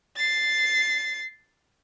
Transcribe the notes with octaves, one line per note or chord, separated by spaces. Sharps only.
A6 C7